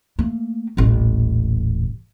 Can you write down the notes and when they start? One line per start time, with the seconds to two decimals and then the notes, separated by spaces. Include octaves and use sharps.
0.19 A3 A#3
0.77 D#1 A1